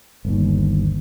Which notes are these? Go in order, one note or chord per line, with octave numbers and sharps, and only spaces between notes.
G1 D#2